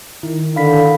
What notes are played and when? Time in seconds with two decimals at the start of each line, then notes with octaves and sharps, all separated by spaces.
0.23 D#3 E4
0.56 D3 F5 B5 B6